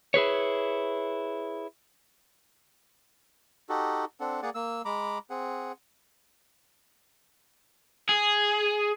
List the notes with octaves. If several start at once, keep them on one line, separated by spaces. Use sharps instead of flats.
E4 G#4 B4 C#5
D#4 F#4 G4 A4
C4 D4 A4 F#5
A#3 G#4 D5 F#5
A#3 E6
G#3 A#5 B5 D6
C4 G#4 F#5
G#4